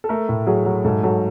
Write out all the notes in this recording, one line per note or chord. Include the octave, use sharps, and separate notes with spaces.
A4
A3 A#4
A2
F#3 G#4
F#3
G#2 A4
F#3 A4